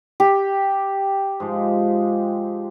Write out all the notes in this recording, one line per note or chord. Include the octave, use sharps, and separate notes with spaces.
G4
G#2 F3 G#3